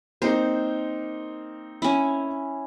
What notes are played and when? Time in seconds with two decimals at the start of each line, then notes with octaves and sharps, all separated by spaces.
0.22 A#3 C4 D#4 C5
1.82 C#4 E4